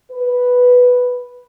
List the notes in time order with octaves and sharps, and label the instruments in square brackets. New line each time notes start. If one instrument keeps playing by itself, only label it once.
[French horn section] B4